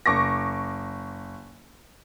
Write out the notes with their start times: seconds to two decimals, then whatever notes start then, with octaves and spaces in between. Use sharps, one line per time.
0.06 F#1 C#6 D6 A#6